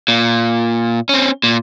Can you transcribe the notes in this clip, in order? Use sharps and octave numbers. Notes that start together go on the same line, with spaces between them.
A#2
C4 C#4
A#2